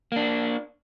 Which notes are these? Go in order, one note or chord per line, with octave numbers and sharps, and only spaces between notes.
A#3 D4